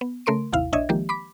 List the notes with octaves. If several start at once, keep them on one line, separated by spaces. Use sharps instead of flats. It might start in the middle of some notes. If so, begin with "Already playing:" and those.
B3
C#3 A3 A#4 C6 D7
G#1 D#2 C3 E4 F5
A#1 D4 C#5 D#5 E5 G#6
D#3 F3 G#3 A#3 G4
B5 D6 B6